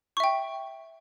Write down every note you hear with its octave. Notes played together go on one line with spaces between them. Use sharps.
E5 G5 C#6